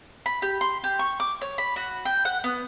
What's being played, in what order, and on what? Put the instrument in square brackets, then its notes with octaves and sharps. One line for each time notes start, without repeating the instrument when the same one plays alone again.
[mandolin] B5
G4
C6
G4
C#6
D6
C#5
B5
F#4
G5
F#5
B3